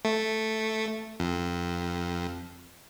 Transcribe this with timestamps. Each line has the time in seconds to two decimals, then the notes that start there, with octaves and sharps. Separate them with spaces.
0.05 A3
1.20 F2